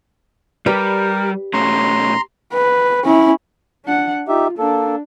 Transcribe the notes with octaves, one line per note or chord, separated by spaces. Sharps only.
G3 G4 A#4 B4 D5
B2 A3 C#4 A#5 C6
B4
C#4 E4
D4 F#5
D#4 F4 G4 E5
A#3 D4 A4